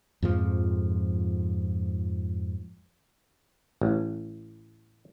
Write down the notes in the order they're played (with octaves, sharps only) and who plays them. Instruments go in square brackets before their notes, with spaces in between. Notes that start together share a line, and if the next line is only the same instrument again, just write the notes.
[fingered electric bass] F2 G#2 F3
[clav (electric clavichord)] A1